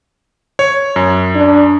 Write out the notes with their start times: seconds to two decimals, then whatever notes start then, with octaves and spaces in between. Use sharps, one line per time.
0.59 C#5
0.96 F#2
1.35 D4